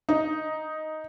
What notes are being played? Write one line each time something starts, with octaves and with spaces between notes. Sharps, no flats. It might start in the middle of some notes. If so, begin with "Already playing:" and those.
D#4